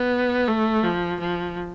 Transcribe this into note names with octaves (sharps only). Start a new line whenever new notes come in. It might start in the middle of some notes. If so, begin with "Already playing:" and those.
Already playing: B3
A3
F3
F3